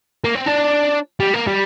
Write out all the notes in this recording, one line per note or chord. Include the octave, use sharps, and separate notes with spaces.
A#3
C4
D4
G3
A#3
G3